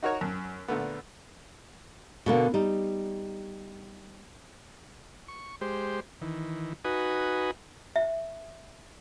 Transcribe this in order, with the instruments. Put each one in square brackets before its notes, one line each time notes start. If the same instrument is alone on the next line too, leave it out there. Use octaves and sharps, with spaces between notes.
[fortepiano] D#4 F#4 A#4 C#5
F#2
A#2 D3 A3 B3
[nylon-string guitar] B2 D3 A#3
G3 D#4
[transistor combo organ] C#6
G#3 G4 C5
D#3 E3
D#4 F#4 B4 G#5 D#6
[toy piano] E5